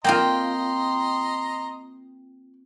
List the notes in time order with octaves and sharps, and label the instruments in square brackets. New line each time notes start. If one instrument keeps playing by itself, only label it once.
[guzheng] A#3 C4 F4 [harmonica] D#5 A#5 C6 [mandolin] G5